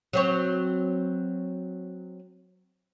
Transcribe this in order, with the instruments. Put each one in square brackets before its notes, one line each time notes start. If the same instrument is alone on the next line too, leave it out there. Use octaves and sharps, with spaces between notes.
[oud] F#3 C4 C#5